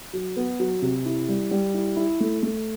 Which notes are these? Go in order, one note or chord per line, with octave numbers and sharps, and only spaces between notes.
F#3
B3
F#3
C3
E4
G3
G3
E4
E4
A3
A3